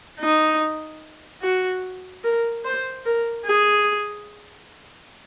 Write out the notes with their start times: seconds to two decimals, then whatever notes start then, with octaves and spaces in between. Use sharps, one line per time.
0.20 D#4
1.42 F#4
2.24 A#4
2.65 C5
3.06 A#4
3.46 G#4